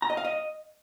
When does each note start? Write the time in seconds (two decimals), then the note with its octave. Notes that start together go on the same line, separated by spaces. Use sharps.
0.02 A#5
0.10 D#5
0.17 F5
0.25 D#5